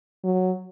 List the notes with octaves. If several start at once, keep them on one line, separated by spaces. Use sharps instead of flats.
F#3